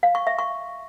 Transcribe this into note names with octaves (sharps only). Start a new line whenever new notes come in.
F5
C#6
E5
C#6